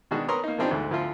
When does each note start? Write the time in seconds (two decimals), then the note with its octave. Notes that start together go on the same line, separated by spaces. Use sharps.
0.11 B2 D#3 G#3 D4 F#4
0.28 B3 A#4 C#5 A#5 C6 D#6
0.44 A#3 D#4
0.58 B2 F3 C4 D4 D#4 G4
0.71 D2 G#2 A3
0.91 D2 F3 E4 F4